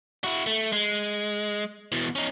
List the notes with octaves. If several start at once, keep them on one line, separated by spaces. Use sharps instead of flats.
E4 F#4
A3
G#3
B2 E3
C#4 D#4